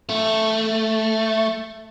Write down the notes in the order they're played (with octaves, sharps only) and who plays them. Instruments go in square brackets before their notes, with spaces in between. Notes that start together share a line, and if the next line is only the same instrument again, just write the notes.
[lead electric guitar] A3